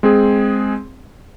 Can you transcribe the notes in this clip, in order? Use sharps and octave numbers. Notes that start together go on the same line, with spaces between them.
G#3 C4 G#4